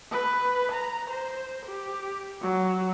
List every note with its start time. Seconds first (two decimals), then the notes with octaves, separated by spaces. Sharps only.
0.11 B4
0.72 A#5
1.10 C5
1.66 G4
2.42 F#3